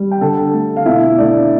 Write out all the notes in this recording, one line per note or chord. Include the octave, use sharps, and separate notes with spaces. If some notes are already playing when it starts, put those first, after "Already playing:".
Already playing: G3
G5
D3 A4 A5
A3
F5
B2 E4 E5
A3 D4 D5